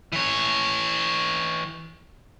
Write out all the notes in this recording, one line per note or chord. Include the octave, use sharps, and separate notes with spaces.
E3 C#5